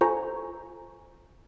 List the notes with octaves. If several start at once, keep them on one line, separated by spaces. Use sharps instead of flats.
F4 A4 C5 G#5 A#5 C#6